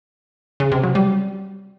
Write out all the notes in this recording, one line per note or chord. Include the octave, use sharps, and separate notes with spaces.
C#3
C3
F#3
G3